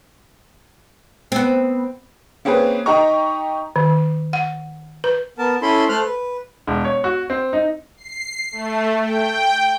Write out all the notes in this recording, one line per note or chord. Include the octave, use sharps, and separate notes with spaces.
B3 C4
A#3 C4 C#4 G#4 B4
D#4 G4 D#5 A#5 C#6
D#3
F#5
B4
B3 A#4 A5
C#4 E4 A4 B5 C6
A3 A4 C5 F6 F#6
B4
E1
C#5
F#4
C4
D#4
C7
A3
G5